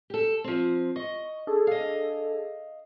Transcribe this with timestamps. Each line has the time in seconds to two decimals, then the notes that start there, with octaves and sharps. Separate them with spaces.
0.10 G4 A4
0.44 F3 C4
0.96 D#5 C#6
1.47 D4 G#4 A4
1.67 D#5 F5